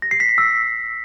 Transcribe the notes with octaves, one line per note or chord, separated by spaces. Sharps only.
A#6
C7
B6
C7
E6